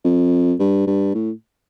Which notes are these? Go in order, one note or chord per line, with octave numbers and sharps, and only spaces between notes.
F2
G2
G2
A2